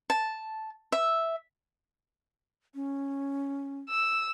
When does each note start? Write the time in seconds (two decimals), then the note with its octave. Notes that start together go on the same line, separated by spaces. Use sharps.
0.10 A5
0.92 E5
2.75 C#4
3.90 E6